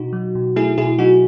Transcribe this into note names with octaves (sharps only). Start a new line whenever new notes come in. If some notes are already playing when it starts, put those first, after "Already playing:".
Already playing: B2 D#4 F#4
F#3
B2
A3 E4 G#4
B2 E4 G#4
F#3 D#4 F#4